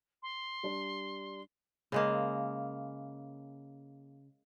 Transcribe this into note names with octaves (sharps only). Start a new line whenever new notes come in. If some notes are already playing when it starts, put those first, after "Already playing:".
C6
G3 D4
C#3 G#3 A#3